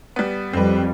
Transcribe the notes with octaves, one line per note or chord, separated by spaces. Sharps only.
G3 B3
F2 G3 C4 B4